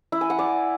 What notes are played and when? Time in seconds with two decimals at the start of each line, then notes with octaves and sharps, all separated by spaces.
0.12 E4
0.21 G#5
0.30 F#5
0.39 D5